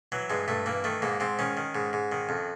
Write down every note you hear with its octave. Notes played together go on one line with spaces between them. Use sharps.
E3 F#3
G2 G#3
G2 A3
E3 A#3
D#3 A3
G#2 A#3
G#2 C4
D#3 C#4
D#3
G#2
G#2
D#3
F2